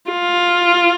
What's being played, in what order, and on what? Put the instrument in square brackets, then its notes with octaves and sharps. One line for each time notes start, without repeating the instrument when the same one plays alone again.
[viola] F4